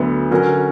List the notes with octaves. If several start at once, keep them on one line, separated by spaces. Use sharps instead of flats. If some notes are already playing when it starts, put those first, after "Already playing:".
Already playing: D2 D3 F#3 B3
D3 F#3 C#4 F#4 A#4